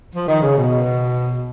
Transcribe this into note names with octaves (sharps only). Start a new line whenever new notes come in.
F3
D#3
C#3
B2